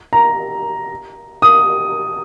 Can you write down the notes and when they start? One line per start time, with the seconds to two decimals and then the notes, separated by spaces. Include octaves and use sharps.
0.13 A#5
1.42 D#6